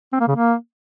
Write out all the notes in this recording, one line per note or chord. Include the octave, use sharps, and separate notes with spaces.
C4
A#3
C#3
A#3